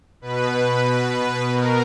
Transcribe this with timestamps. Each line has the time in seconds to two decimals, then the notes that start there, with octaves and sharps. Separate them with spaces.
0.21 B2 B4
1.53 B2 A#4